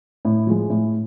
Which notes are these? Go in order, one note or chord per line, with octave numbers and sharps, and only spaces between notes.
A2
F3 G#3
A2